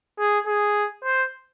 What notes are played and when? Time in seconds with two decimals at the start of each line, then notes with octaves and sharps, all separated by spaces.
0.19 G#4
0.47 G#4
1.04 C5